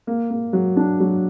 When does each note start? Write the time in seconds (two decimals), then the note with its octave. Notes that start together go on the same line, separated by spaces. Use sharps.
0.07 A#3
0.30 A#3
0.53 F#3
0.77 D4
1.00 F#3